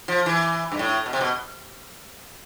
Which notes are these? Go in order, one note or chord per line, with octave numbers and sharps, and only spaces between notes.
F3
E3
G2
A2
B2
C3
B2